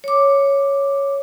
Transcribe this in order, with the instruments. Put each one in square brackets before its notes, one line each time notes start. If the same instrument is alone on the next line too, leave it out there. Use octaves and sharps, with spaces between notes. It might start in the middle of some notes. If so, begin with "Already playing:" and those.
[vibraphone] C#5 D6